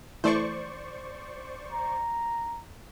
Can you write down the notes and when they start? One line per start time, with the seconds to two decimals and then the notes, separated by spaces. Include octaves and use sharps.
0.24 E3 A3 C5 D5 C#6
1.72 A#5